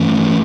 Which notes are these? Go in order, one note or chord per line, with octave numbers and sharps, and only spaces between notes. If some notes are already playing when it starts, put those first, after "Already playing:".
Already playing: G2 E3 A3 C#4